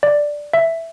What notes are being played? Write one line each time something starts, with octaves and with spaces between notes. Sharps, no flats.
D5
E5